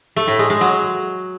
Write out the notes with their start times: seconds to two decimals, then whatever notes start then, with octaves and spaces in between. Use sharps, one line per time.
0.16 A3
0.28 A2
0.39 G#3
0.50 G#3
0.61 F#3